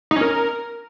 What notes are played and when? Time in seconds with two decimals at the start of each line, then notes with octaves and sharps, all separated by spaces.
0.11 D#4
0.16 C#4
0.21 A#4